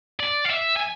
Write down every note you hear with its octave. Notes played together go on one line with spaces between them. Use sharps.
D5
F5
E5
G#5